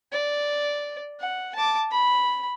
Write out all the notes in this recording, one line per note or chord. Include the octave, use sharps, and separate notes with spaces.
D5
F#5
A5 D6
B5